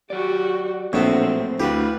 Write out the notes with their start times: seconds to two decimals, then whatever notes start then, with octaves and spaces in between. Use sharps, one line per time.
0.10 F#3 F#4 G4 D5
0.93 A#1 A2 F#3 B3 C4 C#5 E5
1.60 D2 E4 G4 B4 F5 F#5